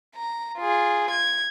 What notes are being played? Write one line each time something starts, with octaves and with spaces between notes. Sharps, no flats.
A#5
F4 G#4
G#6